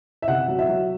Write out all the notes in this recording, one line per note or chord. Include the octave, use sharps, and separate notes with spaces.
E5
C3 F#5
F#3
E5
F#3